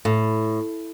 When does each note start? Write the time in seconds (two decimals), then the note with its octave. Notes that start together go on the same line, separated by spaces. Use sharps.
0.05 A2